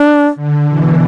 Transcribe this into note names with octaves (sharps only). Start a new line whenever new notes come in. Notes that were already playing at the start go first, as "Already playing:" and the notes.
Already playing: D4
D3
B2 E3